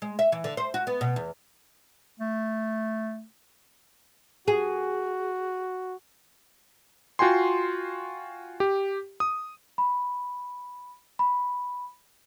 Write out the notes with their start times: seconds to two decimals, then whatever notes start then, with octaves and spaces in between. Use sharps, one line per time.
0.02 G#3
0.19 E5
0.32 E3
0.44 D3
0.57 C5
0.74 F#4
0.87 B3
1.01 B2
1.16 E2
2.19 A3
4.48 F#4 G#4
7.19 F4 F#4 G5 G#5 C6
8.60 G4
9.20 D#6
9.78 B5
11.19 B5